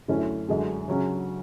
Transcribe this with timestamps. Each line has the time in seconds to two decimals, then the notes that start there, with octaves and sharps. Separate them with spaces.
0.08 F#2 D3 A3 C#4 E4
0.48 F#2 D3 G#3
0.88 C#3 F#3 C#4